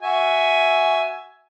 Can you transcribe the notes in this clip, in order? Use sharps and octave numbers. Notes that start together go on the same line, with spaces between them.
F#4 E5 G#5